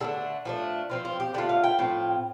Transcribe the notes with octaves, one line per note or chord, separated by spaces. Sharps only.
D3 A3 D4 A4
F3 A3 D4
F3 C4 F4
F4
G4
D3 A3 F4 D5
F5
G5
A2 F3 C4 F4